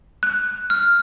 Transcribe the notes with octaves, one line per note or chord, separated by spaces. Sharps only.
F#6
F6